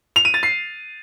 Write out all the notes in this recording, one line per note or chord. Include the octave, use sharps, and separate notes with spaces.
F7
D#7
A6
C7